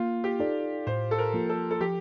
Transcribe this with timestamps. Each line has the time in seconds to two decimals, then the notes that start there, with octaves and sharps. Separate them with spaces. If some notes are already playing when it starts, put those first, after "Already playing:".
Already playing: A#3 F4
0.24 G4
0.40 D#4 A4 D5
0.87 A2 C5
1.11 A4
1.18 A#4
1.34 F3 A#3 F4
1.49 A4
1.71 A4
1.81 F3 G4